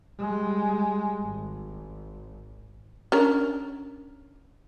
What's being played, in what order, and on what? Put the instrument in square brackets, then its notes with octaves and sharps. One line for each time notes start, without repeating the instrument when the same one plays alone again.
[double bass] G3 G#3
G#1
[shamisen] C#4 D4 A#4